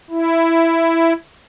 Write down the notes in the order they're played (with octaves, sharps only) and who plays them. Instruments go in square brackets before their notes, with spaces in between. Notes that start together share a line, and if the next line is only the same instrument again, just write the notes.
[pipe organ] E4